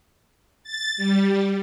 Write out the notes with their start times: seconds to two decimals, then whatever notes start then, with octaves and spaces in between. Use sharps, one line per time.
0.63 A6
0.97 G3